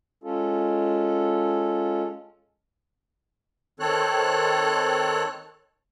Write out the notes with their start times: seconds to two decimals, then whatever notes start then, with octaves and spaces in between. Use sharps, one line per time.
0.24 G#3 C#4 F4 A4
3.80 D#3 C4 A4 C#5 F#6